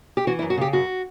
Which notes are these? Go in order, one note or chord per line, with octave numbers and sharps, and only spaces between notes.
G4
E3 F#4
E4
F#2
F#4
C#3 G4
F#2 F#4